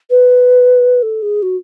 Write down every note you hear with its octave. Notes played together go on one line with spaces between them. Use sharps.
B4
A4
G#4
F#4